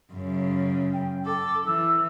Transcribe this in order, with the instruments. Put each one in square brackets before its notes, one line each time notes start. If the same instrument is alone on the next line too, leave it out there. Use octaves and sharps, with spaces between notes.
[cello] F#2 C#3
[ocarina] G5
[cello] A4 [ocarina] D6
[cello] E3 [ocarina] E6